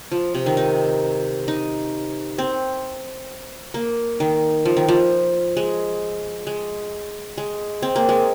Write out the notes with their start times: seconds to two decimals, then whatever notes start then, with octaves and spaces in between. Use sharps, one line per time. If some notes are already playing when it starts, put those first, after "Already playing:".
0.12 F3
0.35 C3
0.46 D#3
0.57 D#4
1.48 D#4
2.38 C4
3.74 A#3
4.20 D#3
4.65 F3
4.77 D#3
4.88 F3
5.57 G#3
6.47 G#3
7.38 G#3
7.82 C4
7.96 A#3
8.09 G#3